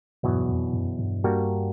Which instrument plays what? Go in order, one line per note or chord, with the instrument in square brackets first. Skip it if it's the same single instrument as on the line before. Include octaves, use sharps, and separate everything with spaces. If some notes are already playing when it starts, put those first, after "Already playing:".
[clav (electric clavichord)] E2 B2 F#3 [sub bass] G2
[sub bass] F2
F#2
G2
[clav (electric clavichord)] G3 A#3 D4 F#4 A#4